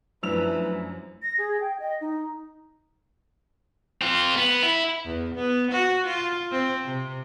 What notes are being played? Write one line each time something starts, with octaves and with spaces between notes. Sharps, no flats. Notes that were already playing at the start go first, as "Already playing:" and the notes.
F#2 F3 A3 D4 E4 B4 E6 F7
A#6
G#4
G5
D#5
D#4
C4 F4
B3
E4
E2
B3
F#4
F4
C4
C3